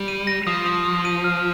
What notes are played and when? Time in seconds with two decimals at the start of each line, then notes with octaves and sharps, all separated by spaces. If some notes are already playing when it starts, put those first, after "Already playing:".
Already playing: G3
0.08 D#7
0.27 A#6
0.47 F3 D#6
0.66 D#6
0.85 D#6
1.05 D#7
1.24 F6